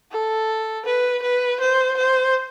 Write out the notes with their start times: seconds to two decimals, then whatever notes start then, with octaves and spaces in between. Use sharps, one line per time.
0.12 A4
0.85 B4
1.23 B4
1.60 C5
1.97 C5